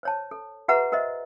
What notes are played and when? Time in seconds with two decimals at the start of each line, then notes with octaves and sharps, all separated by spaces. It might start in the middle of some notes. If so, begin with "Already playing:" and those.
0.03 C5 C#5 A5
0.31 A4
0.68 F#4 G#4 B4 E5 F#5 A#5
0.92 F#4 A#4 C5 D#5 E5